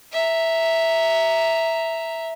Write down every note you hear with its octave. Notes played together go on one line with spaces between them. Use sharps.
E5 A#5